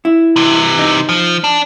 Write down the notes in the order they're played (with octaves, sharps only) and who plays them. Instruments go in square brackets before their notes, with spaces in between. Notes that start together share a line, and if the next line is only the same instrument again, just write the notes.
[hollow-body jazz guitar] E4
[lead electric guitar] C3 E3
[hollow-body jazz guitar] D#4
[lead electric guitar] F3
D4